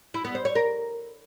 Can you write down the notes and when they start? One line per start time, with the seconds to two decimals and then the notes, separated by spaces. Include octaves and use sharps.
0.14 E4
0.25 B3
0.35 C5
0.45 C#5
0.55 A#4